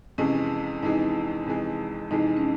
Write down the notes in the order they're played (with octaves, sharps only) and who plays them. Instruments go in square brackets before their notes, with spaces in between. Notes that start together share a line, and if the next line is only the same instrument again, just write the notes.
[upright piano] F2 C3 E3 G#3 [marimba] C#4
[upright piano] F2 C3 E3 G#3 [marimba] D#4
[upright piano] F2 C3 E3 G#3
[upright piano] F2 C3 E3 G#3 [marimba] D#4
[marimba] C#4